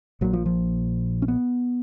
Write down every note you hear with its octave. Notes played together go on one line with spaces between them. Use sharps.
A#1 A#2 F#3
F3
F3
C#4
B3